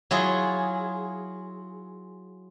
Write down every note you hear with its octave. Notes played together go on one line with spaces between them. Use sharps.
F#3 E4 F4 G#4